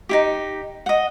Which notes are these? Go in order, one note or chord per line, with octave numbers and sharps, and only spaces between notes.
D#4 E4 G4
D#5 F#5